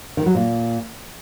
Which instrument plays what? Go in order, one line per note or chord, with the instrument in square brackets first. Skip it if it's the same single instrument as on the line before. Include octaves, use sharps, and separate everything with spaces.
[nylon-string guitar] D#3
F#3
A#2